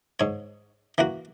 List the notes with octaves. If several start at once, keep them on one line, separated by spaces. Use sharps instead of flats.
G#2 C#5
E3 A#3 F#4